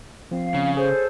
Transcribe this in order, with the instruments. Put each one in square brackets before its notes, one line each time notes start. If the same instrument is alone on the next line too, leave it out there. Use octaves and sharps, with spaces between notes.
[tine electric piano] F3 C4 [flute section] F5
[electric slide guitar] C#3
[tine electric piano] G#4 C#5 [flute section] A4 C5